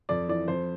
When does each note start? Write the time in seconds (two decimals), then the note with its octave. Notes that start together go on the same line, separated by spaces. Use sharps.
0.09 F2 D5
0.29 E3 D5
0.48 F2 C5